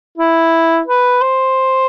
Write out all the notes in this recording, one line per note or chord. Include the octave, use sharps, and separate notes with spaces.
E4
B4
C5